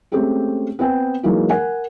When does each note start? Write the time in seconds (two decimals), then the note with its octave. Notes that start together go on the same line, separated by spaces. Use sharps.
0.12 G#3 A3 C4 C#4 G4 G#4
0.79 B3 C4 G5 G#5
1.23 E3 F#3 G#3 A#3 D#4 F#4
1.50 A#4 F#5 G#5